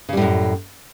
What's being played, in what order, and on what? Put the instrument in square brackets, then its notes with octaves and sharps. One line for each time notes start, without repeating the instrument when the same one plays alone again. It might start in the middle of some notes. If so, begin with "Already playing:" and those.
[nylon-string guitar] C#3
G3
A2
F#2